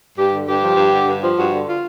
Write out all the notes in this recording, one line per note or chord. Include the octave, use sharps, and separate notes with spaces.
G2 G4
D3
G2 G4
F3
G2
D3
G2
F3
G2 F#4
D3
F4